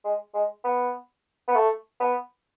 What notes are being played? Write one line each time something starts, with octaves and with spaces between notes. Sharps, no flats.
G#3
G#3
B3
B3
A3
B3